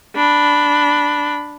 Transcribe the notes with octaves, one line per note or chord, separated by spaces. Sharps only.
D4 B5